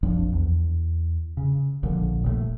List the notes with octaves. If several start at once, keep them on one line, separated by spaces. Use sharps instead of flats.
A#1 F2 F3 D4
E2
C#3
A#1 A#2 D3 F3
D#1 A#2 G3 A3